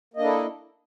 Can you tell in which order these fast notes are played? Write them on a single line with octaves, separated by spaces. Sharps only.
A#3 D#5 D4 E4 A4